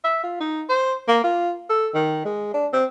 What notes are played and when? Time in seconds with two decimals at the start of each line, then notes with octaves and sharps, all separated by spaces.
0.04 E5
0.23 F4
0.40 D#4
0.69 C5
1.08 A#3
1.24 F4
1.70 A4
1.95 D#3
2.25 G#3
2.54 D4
2.73 C4